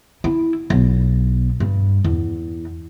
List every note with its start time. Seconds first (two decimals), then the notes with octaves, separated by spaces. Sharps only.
0.24 E4
0.70 B1
1.60 G2
2.04 E2